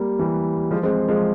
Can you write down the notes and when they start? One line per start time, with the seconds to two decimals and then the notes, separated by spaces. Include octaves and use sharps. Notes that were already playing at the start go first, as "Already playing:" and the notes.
Already playing: G3 A#3
0.19 E3 G3
0.71 F3 G#3
0.83 G#3 C4
1.08 F3 G#3